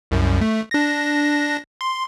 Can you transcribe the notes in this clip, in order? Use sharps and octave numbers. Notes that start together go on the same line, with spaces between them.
C2 F#2
A3
D4 A#6
C6